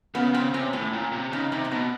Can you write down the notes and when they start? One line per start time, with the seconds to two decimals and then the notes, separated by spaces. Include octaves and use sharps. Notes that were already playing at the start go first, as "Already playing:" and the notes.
0.15 C#3 B3
0.33 C#3 C4
0.53 C3 C#4
0.73 A2 C#4
0.93 A#2
1.12 C3
1.32 C#3 D#4
1.52 C3 D#4
1.65 D#4
1.71 B2 D4